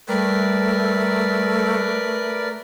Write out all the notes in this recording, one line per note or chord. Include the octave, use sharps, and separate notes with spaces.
G3 A3 A#4 B4 D5